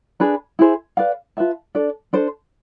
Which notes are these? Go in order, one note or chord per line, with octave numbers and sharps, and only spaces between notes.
D4 G#4 B4
E4 G#4 C5
B4 D5 F5
F4 B4 E5 A5
D4 A4 D5
D4 A4 C5